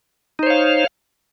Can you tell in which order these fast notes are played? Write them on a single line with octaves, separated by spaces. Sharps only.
D#4 C5 C#5 F5